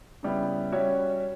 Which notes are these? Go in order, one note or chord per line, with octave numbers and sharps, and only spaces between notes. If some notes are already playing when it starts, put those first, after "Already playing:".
C#3 G3 B3 E4
G3 C#4 F#4 C#5 E5